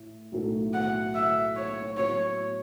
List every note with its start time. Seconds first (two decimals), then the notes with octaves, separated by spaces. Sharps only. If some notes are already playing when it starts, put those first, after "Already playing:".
Already playing: A2
0.32 B1 A2 F#3 A3
0.74 F#5
1.15 E5
1.56 C#5
1.97 A2 F#3 B3 E4 C#5